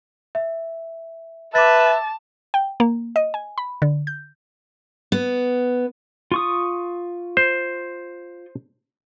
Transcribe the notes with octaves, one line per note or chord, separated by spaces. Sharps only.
E5
B4 E5 A5 D6 A6
G5
A#3
D#5
G#5
B5
D3
G6
B3
F4 C#6 D#6
C5